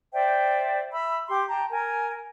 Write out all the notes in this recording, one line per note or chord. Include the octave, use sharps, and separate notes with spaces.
C5 D5 E5 G5
E5 B5 E6
G4 C6 D6
G5 A5 A#5
A#4 G#5